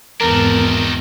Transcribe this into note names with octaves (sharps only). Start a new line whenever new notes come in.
G#1 E2 D#3 D4 A#4